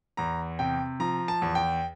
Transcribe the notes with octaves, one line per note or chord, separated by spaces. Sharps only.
E2 A#5
C3 G5
F3 A#5
A5
E2
G5